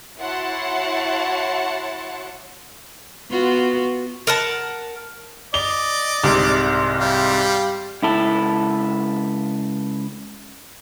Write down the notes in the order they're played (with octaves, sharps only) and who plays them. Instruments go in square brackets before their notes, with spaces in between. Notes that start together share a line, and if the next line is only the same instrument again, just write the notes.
[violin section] E4 F#4 C#5 F#5 A5 C6
[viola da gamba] B3 F4 F#4
[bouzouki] A#4 F#5 A5
[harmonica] D5 D#5 [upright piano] G7
[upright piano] C2 G#2 C3
[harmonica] G3 F5
[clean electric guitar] C#2 E4 A4